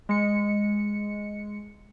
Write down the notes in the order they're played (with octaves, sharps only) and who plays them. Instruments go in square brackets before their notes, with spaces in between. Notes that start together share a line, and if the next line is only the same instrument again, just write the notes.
[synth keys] G#3 C#7